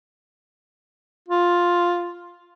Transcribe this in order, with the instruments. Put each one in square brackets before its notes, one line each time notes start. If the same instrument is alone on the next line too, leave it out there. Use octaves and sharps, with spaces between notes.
[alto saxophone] F4